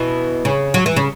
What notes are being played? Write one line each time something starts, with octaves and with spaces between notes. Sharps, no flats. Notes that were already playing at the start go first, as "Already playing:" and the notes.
Already playing: B2 E3
C#3
F#3
E3
C#3